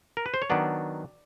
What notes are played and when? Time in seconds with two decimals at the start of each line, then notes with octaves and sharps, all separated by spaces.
0.17 A#4
0.26 B4
0.34 C5
0.42 C#5
0.50 D#3 F#3 B3 D4 D5